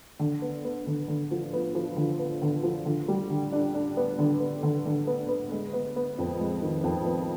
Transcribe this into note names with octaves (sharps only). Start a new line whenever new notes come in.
D3
B3
B3
D3
D3
F3
B3
F3
D3
B3
D3
F3
D3
G3
D3
D4
D4
B3
D3
B3
D3
D3
B3
B3
G#3
B3
B3
F2
G#3
D#3
F2
B3